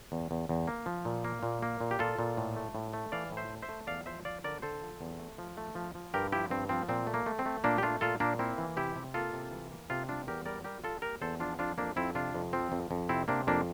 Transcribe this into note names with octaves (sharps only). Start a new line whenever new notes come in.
E2
E2
E2
A#3
F3
A#2
A#3
A#2
A#3
A#2
G4
A#2 F4 A4
A#2
A2
A3
A2
A3
E3 D5 F5
A2
C5 E5
A3
C5 E5
A3
E2 D5 F5
F3 C5 E5
F3 D5 F5
D3 A#4 D5
D3 A4 C5
F3
E2
A3
F3
A3
F3
F3
G2 G4 A#4
F3 E4 G4
G2 C4
F3 C4
A#2 C4
A3
A#3
A3
C4
A3
A#2 A#3 D4
G4
A3 D4 F4
A#2 F4 A4
A#2 A#3 D4
A#3 C4 E4
E3
C3 E4 G4
C3
A#3 F4 A4
C3
E3
A#3
C3 F4 A4
G3 D4 F4
E2 G4 A#4
G3 A#4 D5
G3 G4 A#4
G3 F4 A4
A#3 G4 A#4
E2 A4 C5
F3 D4 F4
F2 D4 F4
F2 A#3 D4
F2 C4 E4
C3 D4 F4
F2
F3 C4
F2
F2
C3 C4 E4
C3 A#3 D4
F2 A#3 D4